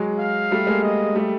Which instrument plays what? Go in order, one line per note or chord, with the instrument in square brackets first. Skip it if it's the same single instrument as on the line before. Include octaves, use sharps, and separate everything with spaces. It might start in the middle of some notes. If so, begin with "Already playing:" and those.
Already playing: [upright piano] F#3 G#3
[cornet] F5
[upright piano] G3 A3
G#3 A#3
[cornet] D#5
[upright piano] G3 A3